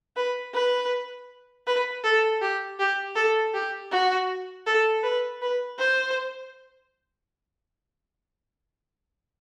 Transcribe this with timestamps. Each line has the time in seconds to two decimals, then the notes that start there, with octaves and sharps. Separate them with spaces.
0.16 B4
0.54 B4
1.67 B4
2.04 A4
2.41 G4
2.80 G4
3.16 A4
3.54 G4
3.92 F#4
4.67 A4
5.03 B4
5.42 B4
5.79 C5